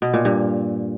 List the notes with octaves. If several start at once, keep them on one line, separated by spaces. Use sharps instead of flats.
B2
A#2
G2